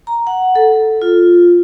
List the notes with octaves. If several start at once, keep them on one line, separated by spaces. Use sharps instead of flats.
A#5
F#5
A4
F4